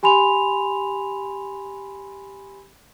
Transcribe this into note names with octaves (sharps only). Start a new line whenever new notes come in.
G4 G#5 B5 C6 F7